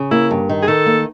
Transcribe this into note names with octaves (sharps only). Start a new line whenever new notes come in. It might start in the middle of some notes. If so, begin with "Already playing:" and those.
Already playing: C#3
A#3 E4
G2
D#3
G#4
D#3 A4
A#3